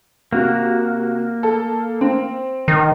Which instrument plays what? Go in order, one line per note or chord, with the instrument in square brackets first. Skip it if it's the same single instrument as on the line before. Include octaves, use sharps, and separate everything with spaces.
[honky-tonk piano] C3 F#4 [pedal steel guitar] A#3
[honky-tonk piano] A4
C4
[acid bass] D#3